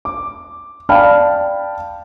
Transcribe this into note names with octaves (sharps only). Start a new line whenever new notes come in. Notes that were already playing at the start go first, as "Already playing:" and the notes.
D6
D5 F5 G5 A5 B5 F6